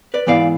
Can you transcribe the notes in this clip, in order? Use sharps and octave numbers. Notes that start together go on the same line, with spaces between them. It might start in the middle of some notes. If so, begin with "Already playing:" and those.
B4 D5
G#2 E3 B3 E4 D5 F5